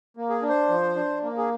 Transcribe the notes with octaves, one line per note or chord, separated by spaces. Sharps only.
A#3
G#4
D4
C5
F3
D4
A#3
G#4